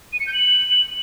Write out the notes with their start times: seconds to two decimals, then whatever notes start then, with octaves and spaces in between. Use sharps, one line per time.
0.13 D#7
0.20 C#7
0.27 G6
0.34 F#7